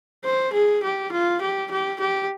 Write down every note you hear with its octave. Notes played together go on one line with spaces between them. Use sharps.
C5
G#4
G4
F4
G4
G4
G4